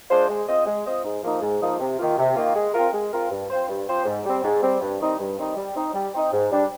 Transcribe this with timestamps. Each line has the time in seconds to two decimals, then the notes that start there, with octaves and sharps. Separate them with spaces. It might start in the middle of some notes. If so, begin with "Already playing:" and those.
0.10 G#3 D4 F4 C5
0.29 G#3
0.48 C4 F4 C5 D#5
0.66 G#3
0.86 C4 F4 C5 D#5
1.04 G#2
1.23 F3 A#3 D#4
1.42 G#2
1.61 F3 A#3 D#4
1.80 C3
1.99 D#3 A#3 F4
2.18 C3
2.36 D#3 A#3 F4
2.55 G#3
2.74 C4 F4 A#4
2.93 G#3
3.12 C4 F4 A#4
3.31 G2
3.50 F3 C4 F4 C5
3.69 G2
3.88 F3 C4 F4 C5
4.06 G#2
4.24 G3
4.29 C4
4.44 G#2
4.62 G3 C4
4.81 G2
5.00 D#3 G3 C4 D#4
5.19 G2
5.38 D#3 G3 C4 D#4
5.56 G3
5.76 C4 D#4
5.94 G3
6.13 C4 D#4
6.33 G#2
6.51 G3 D4